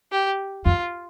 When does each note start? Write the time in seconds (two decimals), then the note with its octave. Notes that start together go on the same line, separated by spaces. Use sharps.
0.12 G4
0.65 F2 F4